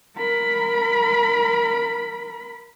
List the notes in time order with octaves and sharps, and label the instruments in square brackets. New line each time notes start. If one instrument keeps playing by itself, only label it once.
[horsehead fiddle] A#4 B5